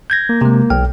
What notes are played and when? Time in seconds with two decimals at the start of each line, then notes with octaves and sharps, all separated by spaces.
0.10 G6 G#6 A#6
0.29 A#3
0.41 C3 G#3
0.70 B1 G5 F6